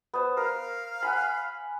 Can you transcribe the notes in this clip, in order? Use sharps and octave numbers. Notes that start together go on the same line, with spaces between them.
B3 C5
A#4 F5
F#5 G#5 B5